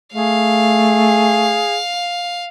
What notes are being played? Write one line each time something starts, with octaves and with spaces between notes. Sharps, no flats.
A3 G#4 F5